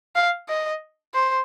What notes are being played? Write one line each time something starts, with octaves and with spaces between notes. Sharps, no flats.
F5
D#5
C5